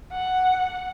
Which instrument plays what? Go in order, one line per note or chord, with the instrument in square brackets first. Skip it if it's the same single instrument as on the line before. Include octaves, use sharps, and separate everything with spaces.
[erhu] F#5